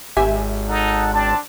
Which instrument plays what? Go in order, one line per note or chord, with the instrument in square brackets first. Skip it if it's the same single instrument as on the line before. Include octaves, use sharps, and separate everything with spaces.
[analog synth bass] G#1 [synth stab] G4 E5 G#5
[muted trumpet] D#4 [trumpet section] A4 F#5
[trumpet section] C4 A5 [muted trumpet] D4